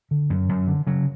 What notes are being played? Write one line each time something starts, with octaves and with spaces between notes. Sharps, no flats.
D3
F#2
F#2
D3
C#3 F#3